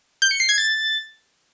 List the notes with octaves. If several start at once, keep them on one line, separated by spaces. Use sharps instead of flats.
G6
C#7
C7
G#6
A6